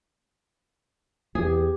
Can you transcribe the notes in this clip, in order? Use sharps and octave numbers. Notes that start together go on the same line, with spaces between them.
E2 G4 G#4